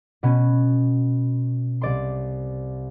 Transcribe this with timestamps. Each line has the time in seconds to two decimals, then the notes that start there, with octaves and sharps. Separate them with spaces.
0.23 B2 B3 C#4
1.81 C2 D5 C6